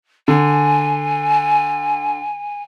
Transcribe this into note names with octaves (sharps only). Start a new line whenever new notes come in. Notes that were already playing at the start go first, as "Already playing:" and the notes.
D3 G#5